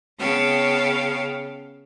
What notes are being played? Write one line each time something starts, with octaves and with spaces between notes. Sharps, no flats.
C#3 B3 C#5 F5 G5 A5